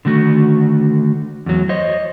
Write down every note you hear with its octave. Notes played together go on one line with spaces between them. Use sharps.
D3 D#3 A3 F#4
E2 F#3
C5 C#5 D#5